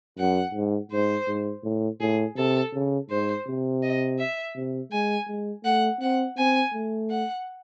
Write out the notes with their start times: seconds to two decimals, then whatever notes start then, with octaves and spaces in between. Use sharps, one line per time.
0.18 F#2 F#5
0.54 G#2
0.91 G#2 C5
1.27 G#2
1.64 A2
2.00 A2 G#4
2.36 C3 A4
2.73 C#3
3.10 G#2 C5
3.47 C3
3.83 D#5
4.19 E5
4.56 C3
4.92 G#3 G#5
5.28 G#3
5.64 A3 F#5
6.01 C4 F#5
6.38 C4 G#5
6.73 A3
7.10 F#5